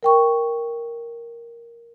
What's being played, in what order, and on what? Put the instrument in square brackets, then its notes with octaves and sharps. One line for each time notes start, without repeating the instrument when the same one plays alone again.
[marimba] A#4 G5 C#6